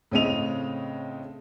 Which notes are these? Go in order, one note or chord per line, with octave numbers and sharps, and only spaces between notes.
A2 C#3 C4 D#5 D#7 F7